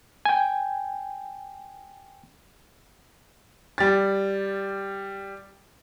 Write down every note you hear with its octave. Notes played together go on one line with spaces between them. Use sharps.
G5 G#5
G3 A6